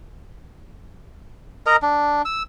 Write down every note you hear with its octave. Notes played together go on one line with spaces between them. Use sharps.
A#4 D#5 A#5
D4
E6